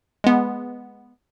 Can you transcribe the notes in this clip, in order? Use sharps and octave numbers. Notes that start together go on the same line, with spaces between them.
G#3 B3